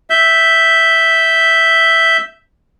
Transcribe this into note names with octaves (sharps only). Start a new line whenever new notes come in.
E5 G6